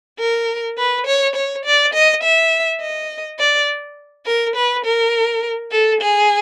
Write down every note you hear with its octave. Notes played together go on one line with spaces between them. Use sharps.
A#4
B4
C#5
C#5
D5
D#5
E5
D#5
D5
A#4
B4
A#4
A4
G#4